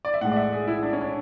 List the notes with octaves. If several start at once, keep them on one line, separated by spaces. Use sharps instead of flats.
D5
E5
A2 G#3 F#5
D5
E5
G#4
E4
D4
C#4
D4